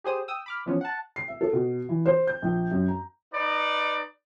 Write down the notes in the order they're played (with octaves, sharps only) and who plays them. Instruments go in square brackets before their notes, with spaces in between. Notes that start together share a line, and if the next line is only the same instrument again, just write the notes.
[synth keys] G4 G#4 C5 D#6
G5 D#6 E6
B5 D6 F6
E3 F3 B3 C#4
F#5 A5
[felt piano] C7
E5
A4
B2
E3
C5
G6
A#1
F#2
A#5
[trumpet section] D#4 B4 D5